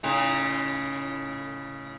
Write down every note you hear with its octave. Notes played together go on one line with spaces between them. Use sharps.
A2 C#3 D#4